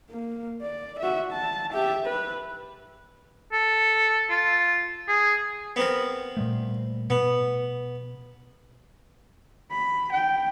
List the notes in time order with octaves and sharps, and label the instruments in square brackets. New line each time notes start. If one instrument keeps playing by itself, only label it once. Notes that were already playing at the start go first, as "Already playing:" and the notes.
[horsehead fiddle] A#3
D5
F#4 E5
A5
G4 E5
B4
[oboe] A4
F4
G#4
[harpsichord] B3 C4 A#4
[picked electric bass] A#2 G3 A3
[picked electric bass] B2 [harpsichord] B3
[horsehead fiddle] B5
G5